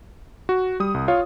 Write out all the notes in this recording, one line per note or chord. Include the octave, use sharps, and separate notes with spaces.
F#4
G3 D#6
C2
F4 C#5 F5